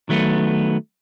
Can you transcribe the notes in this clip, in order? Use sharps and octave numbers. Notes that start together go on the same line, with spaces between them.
D#3 F#3 A3 B3